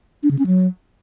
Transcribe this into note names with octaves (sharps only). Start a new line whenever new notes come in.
D4
C#3
C#4
F#3